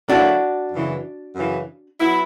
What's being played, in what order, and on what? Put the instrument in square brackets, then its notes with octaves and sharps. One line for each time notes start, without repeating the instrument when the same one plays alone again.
[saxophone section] D3 F#3 A#3 E4 [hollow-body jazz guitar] D4 F#4
[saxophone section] F#2 C#3 E3
F#2 C#3 E3
F#3 B3 E4